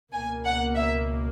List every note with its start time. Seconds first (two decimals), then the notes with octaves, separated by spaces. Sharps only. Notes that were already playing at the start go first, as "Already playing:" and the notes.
0.13 C#2 B2 A#3 G#5
0.45 F#5
0.76 E5